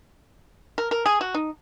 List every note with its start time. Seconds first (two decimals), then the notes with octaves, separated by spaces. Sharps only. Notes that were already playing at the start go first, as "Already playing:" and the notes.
0.78 A#4
0.91 A#4
1.06 G#4
1.21 F#4
1.34 D#4